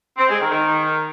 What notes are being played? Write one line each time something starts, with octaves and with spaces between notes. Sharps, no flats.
C4
G#3
D#3
D#3